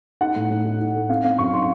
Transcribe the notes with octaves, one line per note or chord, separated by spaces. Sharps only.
D#4 F#5
A2
A2
D#4
D#4
A3
C4 F5
C4 F5
F#2 C#6
D#4 C6